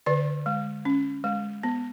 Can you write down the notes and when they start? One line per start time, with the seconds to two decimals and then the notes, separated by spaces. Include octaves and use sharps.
0.06 D3 B4 D5
0.46 G#3
0.85 C#4
1.24 G#3
1.63 B3